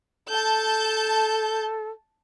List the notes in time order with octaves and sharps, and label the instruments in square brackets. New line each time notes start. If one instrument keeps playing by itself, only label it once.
[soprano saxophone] A4 [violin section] A5 G6